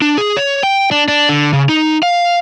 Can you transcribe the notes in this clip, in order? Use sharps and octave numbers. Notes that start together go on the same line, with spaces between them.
D4
G#4
C#5
G5
D4
D4
D3
C#3
D#4
F5